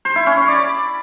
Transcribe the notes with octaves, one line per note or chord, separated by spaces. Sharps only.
C5
E4
C#4
C#5
D5